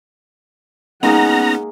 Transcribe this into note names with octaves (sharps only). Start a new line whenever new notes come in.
G#3 A#3 B3 C#4 D#4 G#4 F#5 A#5